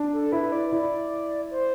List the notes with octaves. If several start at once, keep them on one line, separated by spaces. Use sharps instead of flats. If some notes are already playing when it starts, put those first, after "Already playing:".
Already playing: D4
A4
E4 B4
D5
E4
C5